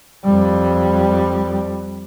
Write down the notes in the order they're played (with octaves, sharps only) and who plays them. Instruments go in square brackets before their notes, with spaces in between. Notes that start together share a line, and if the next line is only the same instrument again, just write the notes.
[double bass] F2 G3